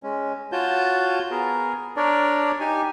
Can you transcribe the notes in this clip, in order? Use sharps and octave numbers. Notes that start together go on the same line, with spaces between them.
G#3 C#4
F4 F#4 C#5 A5 G6
B3 G#4 A#4
D4 A#4 C#5 D5
D#4 G4 G#5